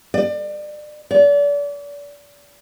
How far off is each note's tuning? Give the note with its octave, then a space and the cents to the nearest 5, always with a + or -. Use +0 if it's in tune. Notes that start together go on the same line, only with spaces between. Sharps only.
D5 +35
D5 -35